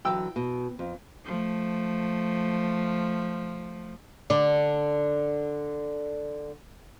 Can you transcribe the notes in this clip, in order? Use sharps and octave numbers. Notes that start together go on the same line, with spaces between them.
D3 E3 F#3 G5 E6
B2
F2
F3 A3
D3 D5